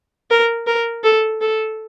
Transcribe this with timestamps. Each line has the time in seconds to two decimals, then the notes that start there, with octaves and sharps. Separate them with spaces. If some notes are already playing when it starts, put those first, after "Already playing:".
0.31 A#4
0.67 A#4
1.04 A4
1.41 A4